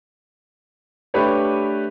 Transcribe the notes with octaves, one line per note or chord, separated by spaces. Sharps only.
A3 D4 G4 B4 C#5